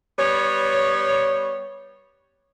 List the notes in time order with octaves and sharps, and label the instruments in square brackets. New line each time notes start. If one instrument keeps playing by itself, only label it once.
[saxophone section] G3 B3 C#5